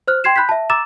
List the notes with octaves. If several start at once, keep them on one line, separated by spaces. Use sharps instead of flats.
C5 F6 F#6
G5 C6 G#6 C7 E7
B5 F#6 G6 B6
E5 A5
A#5 D6 E6 A6 E7